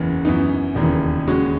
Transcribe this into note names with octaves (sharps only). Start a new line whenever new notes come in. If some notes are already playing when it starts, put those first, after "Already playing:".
Already playing: F#1 E2 C#3 E3
F#2 E3 B3 D#4
E1 D#2 C#3 E3
D#2 C#3 G#3 C#4 F#4